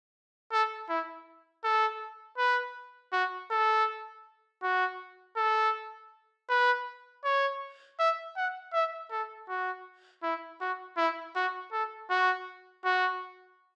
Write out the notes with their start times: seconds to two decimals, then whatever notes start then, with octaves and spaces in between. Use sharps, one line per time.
0.52 A4
0.89 E4
1.64 A4
2.38 B4
3.13 F#4
3.51 A4
4.63 F#4
5.37 A4
6.49 B4
7.24 C#5
7.99 E5
8.36 F#5
8.73 E5
9.11 A4
9.49 F#4
10.23 E4
10.61 F#4
10.97 E4
11.35 F#4
11.72 A4
12.10 F#4
12.85 F#4